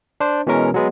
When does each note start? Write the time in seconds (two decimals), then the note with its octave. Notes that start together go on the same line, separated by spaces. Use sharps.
0.20 D4 C5
0.47 B2 E3 G#3 C#4 A#4
0.74 F#3 G#3 B3